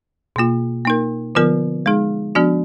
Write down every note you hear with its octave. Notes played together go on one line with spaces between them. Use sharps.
B2 A#3 F4
A#3 D#4 A#4
D3 F3 B3 F4 A#4
G#3 D#4 G#4
F3 B3 D4 F#4